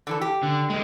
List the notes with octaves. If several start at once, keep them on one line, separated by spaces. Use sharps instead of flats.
D3 E3 A4
G4
D3
D3 G#3